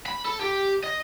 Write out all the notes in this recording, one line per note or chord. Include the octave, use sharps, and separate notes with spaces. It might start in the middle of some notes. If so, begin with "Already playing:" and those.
B5
A4
G4
D#5